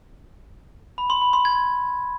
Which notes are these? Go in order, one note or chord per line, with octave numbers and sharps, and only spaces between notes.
B5
C6
B5
C6
G#6